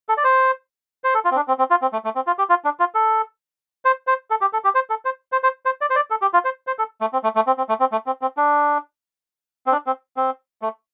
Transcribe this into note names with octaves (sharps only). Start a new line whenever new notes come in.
A4
D5
C5
C5
A4
F4
C4
D4
C4
C4
F4
C4
A3
A3
C4
F4
G4
F4
D4
F4
A4
C5
C5
A4
G4
A4
G4
C5
A4
C5
C5
C5
C5
D5
C5
D5
A4
G4
F4
C5
C5
A4
A3
C4
A3
A3
C4
C4
A3
C4
A3
C4
C4
D4
C4
D4
C4
C4
A3